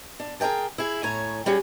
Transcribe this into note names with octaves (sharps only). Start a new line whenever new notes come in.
D4
G#4 A#4 D#5 G5 A5
E4 G#4
A2 C#5 G#5 A#5
G3 C#4 F#4 G#4